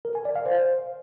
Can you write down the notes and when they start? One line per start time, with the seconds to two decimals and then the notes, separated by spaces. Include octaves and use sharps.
0.05 A#4
0.15 G#5
0.25 D5
0.36 F5
0.46 C5